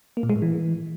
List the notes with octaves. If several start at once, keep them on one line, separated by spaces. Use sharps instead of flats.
A#3
A#2
G#3
A2
E3